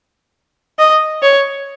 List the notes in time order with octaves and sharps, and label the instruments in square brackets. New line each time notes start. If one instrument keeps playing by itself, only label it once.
[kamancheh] D#5
C#5